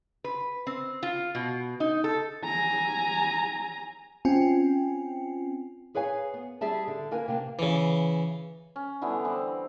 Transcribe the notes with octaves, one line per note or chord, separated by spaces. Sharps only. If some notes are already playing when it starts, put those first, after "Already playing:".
B4
C4
F4
B2
D#4
A4
G#5 A#5
C4 C#4 F4 G5 G#5
G#4 B4 C#5 F5 G#5
B3
G3 G#4 E5 A5
D3
A#3 A#4 B4 G#5
C3 A#3 D4
C#3 E3
C#4
D3 E3 G3 B3
E3 C4